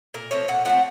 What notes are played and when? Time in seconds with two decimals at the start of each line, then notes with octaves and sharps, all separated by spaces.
0.14 A#2 A#4
0.31 F3 A3 C4 C#5
0.48 A#2 F#5
0.65 F3 A3 C4 F#5